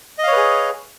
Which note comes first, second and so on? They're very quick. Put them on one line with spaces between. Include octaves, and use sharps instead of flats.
D#5 F5 C#5 B4 G#4